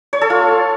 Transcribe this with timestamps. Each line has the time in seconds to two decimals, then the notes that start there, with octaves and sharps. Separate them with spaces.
0.13 C#5
0.21 A4
0.30 F4